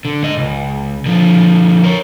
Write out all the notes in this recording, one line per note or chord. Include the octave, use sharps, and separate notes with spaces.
D3
G#2 D#5
C#2
D3 F3
A#4 C#5